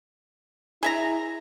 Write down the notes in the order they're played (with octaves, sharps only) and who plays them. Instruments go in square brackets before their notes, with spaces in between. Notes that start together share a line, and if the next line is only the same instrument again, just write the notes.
[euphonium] E4 [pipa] G#4 E5 A#5